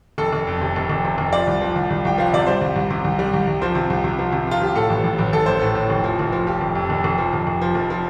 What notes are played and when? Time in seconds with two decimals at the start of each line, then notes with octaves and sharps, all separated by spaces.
0.18 F1 A4
0.33 F1
0.47 F2
0.61 C3
0.76 F1
0.89 F1
1.05 C3
1.18 F1
1.33 F3 D5
1.47 C2
1.61 F3
1.75 C2
1.90 C2
2.05 C2 G5
2.18 F3 F5
2.33 C3 D5
2.47 G3 C5
2.61 C2
2.76 C2
2.90 C3
3.04 C2
3.19 G3
3.33 C2
3.47 C2
3.61 F3 C5
3.75 C3
3.90 C2
4.04 C3
4.19 F3
4.32 C3
4.47 F3 F4
4.61 C3 G4
4.75 A2 A4
4.90 A1
5.04 A1
5.18 A1
5.33 A1 A4
5.46 A1 C5
5.59 A2 A4
5.75 A2
5.90 F1
6.04 F3
6.19 F1
6.32 F3
6.47 F3 G4
6.61 F1
6.75 F2
6.90 F1
7.04 F1
7.18 F3
7.33 F1
7.47 F1
7.61 F3
7.75 F1
7.90 F3